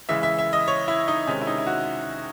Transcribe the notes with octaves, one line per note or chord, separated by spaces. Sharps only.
C#3 E3 G#3 E5
E5
E5
D#5
C#5
E4
D#4
C3 D#3 G#3 C#4
E4
D#4
E4
F#4